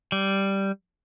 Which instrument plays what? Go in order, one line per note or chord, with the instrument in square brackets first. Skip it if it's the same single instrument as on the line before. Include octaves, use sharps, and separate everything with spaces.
[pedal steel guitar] G3